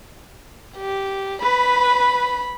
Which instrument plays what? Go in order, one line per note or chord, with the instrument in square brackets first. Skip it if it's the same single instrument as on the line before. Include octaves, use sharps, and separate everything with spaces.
[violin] G4
[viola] B4 [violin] B5